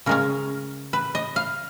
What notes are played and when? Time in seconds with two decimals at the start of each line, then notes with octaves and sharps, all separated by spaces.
0.06 C#3 G#3 C#4 A#4
0.93 B4
1.15 D#5
1.36 F5